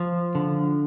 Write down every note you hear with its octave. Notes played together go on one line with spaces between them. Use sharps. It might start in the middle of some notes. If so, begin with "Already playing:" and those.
Already playing: F3
D3